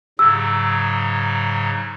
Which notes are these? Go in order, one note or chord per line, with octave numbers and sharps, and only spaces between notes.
G#2 C#3 F#3 E6